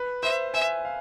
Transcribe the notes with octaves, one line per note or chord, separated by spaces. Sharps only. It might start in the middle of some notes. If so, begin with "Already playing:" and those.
Already playing: B4
C5 E5
E5 G#5
F5